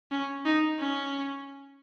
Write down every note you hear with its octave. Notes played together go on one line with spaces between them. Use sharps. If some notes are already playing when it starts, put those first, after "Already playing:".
C#4
D#4
C#4